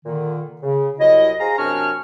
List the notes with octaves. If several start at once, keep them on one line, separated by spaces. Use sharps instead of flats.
A#2 D3 D#3
C#3
C2 F#3 E4 D#5
G#4 C5 F5 A#5
F#2 C3 D4 G#5 C#6 F6